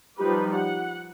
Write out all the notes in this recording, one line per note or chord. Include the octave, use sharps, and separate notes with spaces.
F3 G3 D#4 G4 B4
F#5